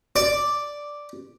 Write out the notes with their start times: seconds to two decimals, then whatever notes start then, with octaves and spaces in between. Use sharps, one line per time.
0.16 D5